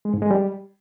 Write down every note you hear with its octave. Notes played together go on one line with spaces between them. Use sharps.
G#3
G#2
G#3
G3